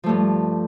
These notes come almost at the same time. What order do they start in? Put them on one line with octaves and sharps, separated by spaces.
F3 A3 G2